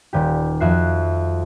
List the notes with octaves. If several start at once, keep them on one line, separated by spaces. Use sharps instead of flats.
D#1 G4
F2 F#4 E5 F#6 C7